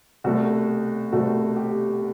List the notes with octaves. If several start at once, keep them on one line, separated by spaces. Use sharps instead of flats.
C2 B2 A3 F#4
C2 B2 A3 F#4
G4